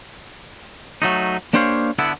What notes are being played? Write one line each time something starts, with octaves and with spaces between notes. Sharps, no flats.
F#3 A3 D#4
A#3 D4 G4 C5 C#5 F5
D3 B3 E4 A4